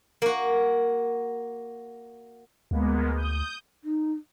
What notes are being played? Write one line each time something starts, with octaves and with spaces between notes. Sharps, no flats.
A#3 F#4
D2 G#3 A#3 B3
D#6 G6
D#4